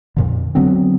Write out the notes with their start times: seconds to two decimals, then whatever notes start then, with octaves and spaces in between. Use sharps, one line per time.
0.17 F2 A#2 D3
0.55 D3 F#3 B3 C4